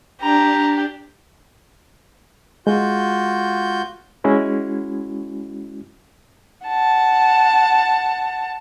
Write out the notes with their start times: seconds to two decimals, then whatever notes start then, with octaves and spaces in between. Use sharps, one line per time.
0.21 D4 G4 A#5
2.67 G#3 F4 F#4 G6
4.24 G#3 C#4 E4 F#4
6.67 F#5 A5